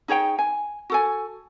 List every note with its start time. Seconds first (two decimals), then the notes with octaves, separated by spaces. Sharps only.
0.08 D#4 G#4 C#5 G5
0.39 G#5
0.90 F#4 A4 G#5